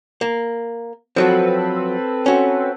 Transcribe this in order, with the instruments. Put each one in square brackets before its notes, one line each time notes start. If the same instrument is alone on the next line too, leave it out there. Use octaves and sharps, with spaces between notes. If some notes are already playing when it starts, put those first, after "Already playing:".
[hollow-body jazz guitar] A#3
[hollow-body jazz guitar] F3 F#3 F#4 [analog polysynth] C4 A4 B4
[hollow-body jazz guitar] C#4 F#4